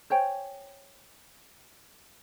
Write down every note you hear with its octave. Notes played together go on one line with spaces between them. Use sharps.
C5 C#5 G5 G#5